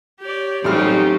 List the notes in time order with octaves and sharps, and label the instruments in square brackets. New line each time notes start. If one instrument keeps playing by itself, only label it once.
[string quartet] G4 C#5 D5
[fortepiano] A1 G3 F6 [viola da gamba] F#3 G4 [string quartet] C4 D#4 F4